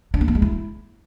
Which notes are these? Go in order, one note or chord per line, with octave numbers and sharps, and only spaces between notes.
D4
A#3
B3
G#3
E4